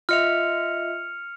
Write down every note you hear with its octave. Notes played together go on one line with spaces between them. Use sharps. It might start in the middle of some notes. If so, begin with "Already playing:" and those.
F4 D#5 E5 F6 C#7 F7